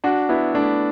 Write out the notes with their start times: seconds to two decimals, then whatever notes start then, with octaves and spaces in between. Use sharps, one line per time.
0.04 D4 F#4
0.29 B3 E4
0.54 A3 D4